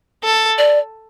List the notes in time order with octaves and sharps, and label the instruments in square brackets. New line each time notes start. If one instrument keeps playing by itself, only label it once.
[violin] A4
[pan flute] D5